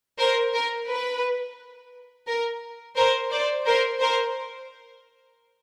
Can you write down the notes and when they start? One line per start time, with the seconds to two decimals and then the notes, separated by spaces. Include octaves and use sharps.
0.19 A#4 C5
0.54 A#4
0.88 B4
2.28 A#4
2.96 A#4 C5
3.32 C5 D5
3.66 A#4 C5
4.01 A#4 C5